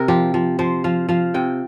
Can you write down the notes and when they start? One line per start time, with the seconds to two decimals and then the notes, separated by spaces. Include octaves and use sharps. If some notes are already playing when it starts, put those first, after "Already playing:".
Already playing: C3 C4 A#4
0.08 F3 G4
0.34 F3
0.59 F3 C5
0.84 F3 F5
1.09 F3 F5
1.34 C3 G5